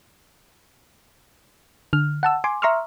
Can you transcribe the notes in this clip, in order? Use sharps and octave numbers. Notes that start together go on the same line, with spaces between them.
D3 F6
F#5 A5 E6
G#5 C6 D6
E5 A#5 C6 C#6 E6 F6